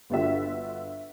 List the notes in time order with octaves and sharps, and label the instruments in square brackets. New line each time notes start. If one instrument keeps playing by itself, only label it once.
[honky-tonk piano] G1 D3 F4 F#4 E5